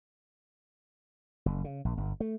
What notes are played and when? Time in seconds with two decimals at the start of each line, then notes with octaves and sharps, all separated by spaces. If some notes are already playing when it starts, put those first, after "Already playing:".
1.46 F#1
1.64 C#3
1.85 A#1
1.98 G1
2.20 A3